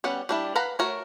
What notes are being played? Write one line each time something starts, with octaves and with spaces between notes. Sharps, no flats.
G3 B3 C#4 F#5
G3 D4 E4
B4 F5 F#5 A#5 B5
A3 F#4 A#4 C#5